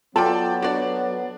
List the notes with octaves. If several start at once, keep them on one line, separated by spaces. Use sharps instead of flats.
F#3 B3 F4 A4 D5 G5 A5 B5
D4 F#4 D5